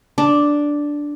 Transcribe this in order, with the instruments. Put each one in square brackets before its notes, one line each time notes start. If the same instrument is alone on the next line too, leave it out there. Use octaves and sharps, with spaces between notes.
[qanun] D4